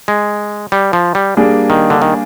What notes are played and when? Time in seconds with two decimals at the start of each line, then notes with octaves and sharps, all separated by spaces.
0.08 G#3
0.72 G3
0.93 F3
1.15 G3
1.37 G3 A#3 D4 G#4
1.70 D#3
1.90 D3
2.02 D#3